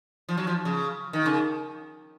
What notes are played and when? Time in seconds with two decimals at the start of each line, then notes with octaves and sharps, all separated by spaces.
0.29 F3
0.37 F#3
0.47 F3
0.65 C#3
1.13 D#3
1.26 C#3